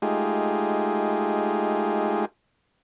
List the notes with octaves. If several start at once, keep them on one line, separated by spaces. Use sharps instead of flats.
G#3 A3 D#4 F4 G4 G#4